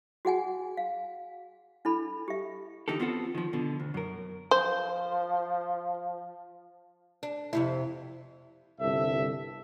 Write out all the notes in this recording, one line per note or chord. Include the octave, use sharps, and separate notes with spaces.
F#4 G#4 F#5 G#5
F5
D4 E4 A4 B5
G4 E5
D3 E3 D#4 G4 A4
B3 C4 F4 F#4 A4 F#5
D#3 F3
B2 D3
D2
F#2 A#4
F3 C5
D4
F2 C3 E4
G1 C2 A4 E5